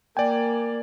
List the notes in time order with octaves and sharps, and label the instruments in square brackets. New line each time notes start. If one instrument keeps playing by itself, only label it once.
[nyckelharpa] A#3 [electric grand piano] D5 G#5 [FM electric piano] G5